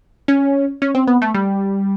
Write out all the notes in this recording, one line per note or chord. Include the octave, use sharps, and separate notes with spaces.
C#4
C#4
C4
B3
A3
G3